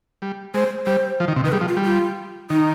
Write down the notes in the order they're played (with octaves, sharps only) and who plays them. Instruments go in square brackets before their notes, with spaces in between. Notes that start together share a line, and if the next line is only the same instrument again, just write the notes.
[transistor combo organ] G3
[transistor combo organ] G#3 [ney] C5
[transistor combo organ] G3 [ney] C5
[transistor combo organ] F3
D#3
C3
[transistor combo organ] D#3 [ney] B4
[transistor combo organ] G3 [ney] G#4
[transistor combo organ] F3
[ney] F4
[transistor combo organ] G3
[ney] F4
[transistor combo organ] D#3 [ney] D#4